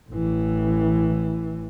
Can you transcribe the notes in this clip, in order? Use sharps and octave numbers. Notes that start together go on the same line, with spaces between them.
A1 E3